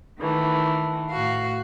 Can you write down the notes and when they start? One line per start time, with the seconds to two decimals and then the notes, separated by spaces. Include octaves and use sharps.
0.19 D#3 E3 A3
1.10 A2 F#4 F5